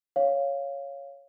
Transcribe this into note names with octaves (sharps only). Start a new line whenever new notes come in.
C#5 F5